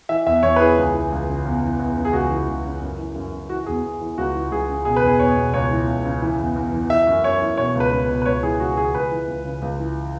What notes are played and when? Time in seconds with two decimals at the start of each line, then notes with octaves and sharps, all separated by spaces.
0.09 E3 E5
0.27 E2 E5
0.43 E2 C#5
0.56 B4
0.60 E3 G#4
0.78 C#2
0.94 E3
1.12 C#2
1.29 C#3
1.46 E2
1.63 E3
1.79 E2
1.97 C#3
2.05 G#4
2.13 C#2 F#4
2.30 E3
2.48 C#2
2.65 C#3
2.81 F#2
2.98 E3
3.16 F#2
3.33 C#3
3.49 E3 F#4
3.66 E2 G#4
3.83 E2
4.01 E3
4.18 C#2 F#4
4.35 E3
4.51 C#2 G#4
4.69 C#3
4.85 B2 G#4
4.96 B4
5.02 E2
5.07 G#4
5.19 E2 C#5
5.36 B2
5.53 C#2 C#5
5.71 E3
5.88 C#2
6.05 C#3
6.22 E3
6.39 E2
6.56 E2
6.72 E3
6.90 E3 E5
7.07 F#2
7.23 F#2 C#5
7.41 E3
7.57 B2 C#5
7.75 C#2 B4
7.92 C#2
8.09 B2
8.22 B4
8.26 C#2 C#5
8.43 E3 G#4
8.60 C#2 F#4
8.77 C#3 G#4
8.94 C#2 B4
9.11 E3
9.28 C#2
9.45 C#3
9.62 C#2
9.79 E3